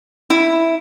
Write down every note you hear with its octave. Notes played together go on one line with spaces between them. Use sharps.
E4